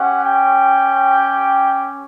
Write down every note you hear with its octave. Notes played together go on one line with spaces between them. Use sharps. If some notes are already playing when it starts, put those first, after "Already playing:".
Already playing: C#4 G4 F#5
G5